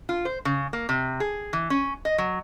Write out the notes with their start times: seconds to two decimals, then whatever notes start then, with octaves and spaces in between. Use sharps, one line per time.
0.09 F4
0.25 C5
0.45 C#3
0.73 A#3
0.89 C3
1.20 G#4
1.53 E3
1.70 C#4
2.05 D#5
2.18 F#3